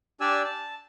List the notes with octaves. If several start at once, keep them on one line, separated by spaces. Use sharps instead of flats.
D4 G4 D5 G#5 E6
A5